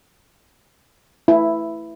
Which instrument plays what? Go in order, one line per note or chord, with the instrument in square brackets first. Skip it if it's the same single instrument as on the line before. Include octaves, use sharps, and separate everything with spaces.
[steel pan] E4